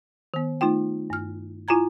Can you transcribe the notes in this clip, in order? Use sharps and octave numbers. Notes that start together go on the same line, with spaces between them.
D#3 B3
A3 D#4 F4 G5
G2 F6
E4 F4 G#5 A#5 G#6